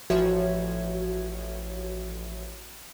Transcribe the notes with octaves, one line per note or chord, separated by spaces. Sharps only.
A1 F3 F#4 C#5 E5 G#6